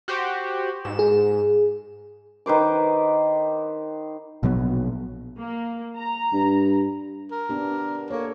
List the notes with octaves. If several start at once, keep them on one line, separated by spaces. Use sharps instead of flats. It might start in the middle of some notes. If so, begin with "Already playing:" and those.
F#4 G4 C5
G#2 E7
G#4
D#3 B4 C5 D6
A#1 B2 F#3 B3
A#3
A#5
G2
A#4
B3 D4 G4
A#3 A4 C#5